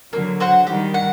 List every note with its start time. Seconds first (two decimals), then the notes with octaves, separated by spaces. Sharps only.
0.13 D3 F#3 A#3
0.40 F#4 C5 F#5
0.66 D#3 G3 G4
0.94 F#5